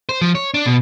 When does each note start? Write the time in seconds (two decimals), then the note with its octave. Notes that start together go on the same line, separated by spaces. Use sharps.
0.09 C5
0.22 F3
0.35 C#5
0.54 D4
0.66 B2